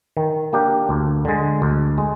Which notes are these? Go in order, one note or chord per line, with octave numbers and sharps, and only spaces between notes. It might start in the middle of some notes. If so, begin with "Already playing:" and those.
D#3
A#3 D4 G4
D2
D3 G#3
D2
G#3